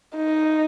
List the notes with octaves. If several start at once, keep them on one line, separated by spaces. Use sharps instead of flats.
D#4